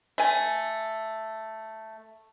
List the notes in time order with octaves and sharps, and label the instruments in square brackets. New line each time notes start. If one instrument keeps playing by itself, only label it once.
[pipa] A3 G#5